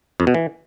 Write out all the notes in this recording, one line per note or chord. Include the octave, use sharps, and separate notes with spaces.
F2
B2
E3